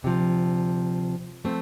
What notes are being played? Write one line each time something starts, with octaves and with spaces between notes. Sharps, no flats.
D2 C3 F3
F3 A3 C4